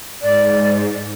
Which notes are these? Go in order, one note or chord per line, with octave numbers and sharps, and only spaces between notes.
G#2 D5